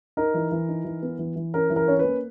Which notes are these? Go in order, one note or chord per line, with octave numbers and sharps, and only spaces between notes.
D#4 A#4
E3
E3
D#4
E3
B3
E3
E3
C#4 A#4
E3
A#4
C#4 C#5
A#3 B4